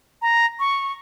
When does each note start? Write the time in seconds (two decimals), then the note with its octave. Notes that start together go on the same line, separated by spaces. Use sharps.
0.22 A#5
0.60 C#6